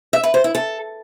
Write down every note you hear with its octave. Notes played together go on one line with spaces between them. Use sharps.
E5
B4
C5
E4
A4